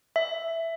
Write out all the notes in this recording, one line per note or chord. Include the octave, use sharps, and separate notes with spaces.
E5